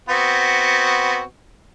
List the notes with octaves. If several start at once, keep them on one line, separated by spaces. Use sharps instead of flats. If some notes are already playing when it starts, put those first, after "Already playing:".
B3 C4 F#4